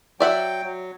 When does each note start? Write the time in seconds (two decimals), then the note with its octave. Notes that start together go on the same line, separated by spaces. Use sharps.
0.20 F#3 D5 E5 F#5 G5
0.63 F#3